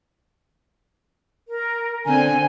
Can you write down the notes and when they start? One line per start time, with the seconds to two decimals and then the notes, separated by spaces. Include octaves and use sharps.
1.48 A#4
2.06 D3 C4 G#5